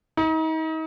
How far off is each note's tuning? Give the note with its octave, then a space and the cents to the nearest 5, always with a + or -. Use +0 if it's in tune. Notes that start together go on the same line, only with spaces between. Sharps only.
D#4 +35